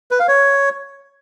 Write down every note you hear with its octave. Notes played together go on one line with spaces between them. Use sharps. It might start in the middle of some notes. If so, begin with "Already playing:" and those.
B4
F5
C#5